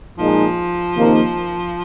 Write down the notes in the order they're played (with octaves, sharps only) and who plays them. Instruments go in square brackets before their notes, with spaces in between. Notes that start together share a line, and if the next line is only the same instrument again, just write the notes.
[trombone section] A#2 G#3 D#4 [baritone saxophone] F3
[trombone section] C3 D#3 A#3 D#4